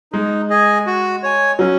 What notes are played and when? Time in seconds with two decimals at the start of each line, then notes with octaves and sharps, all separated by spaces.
0.12 G#3 D#4
0.50 G#4 D#5 G#5
0.87 F#4
1.23 C#5 G#5
1.59 F#3 C#4